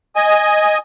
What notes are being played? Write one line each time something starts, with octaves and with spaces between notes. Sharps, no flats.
D#5 G#5